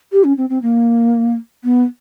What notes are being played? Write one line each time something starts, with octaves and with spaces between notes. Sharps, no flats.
G4
C#4
C4
C4
A#3
B3